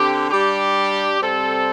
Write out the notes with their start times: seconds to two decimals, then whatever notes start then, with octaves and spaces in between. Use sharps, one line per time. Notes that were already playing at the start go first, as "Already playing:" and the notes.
Already playing: D3 C4 G4
0.31 G3 D4 G4
1.20 C3 G3 C4 A4